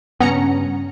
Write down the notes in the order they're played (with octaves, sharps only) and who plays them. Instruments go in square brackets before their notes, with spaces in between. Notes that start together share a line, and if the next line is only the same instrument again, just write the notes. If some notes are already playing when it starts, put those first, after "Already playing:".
[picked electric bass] G2 C#3 [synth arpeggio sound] B3 [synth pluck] C#4 A#5 C#7